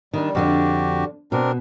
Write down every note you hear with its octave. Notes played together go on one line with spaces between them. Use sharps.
D#3 G3 D4
F2 D3 D4 F#4 G4
B2 C4 D4 A#4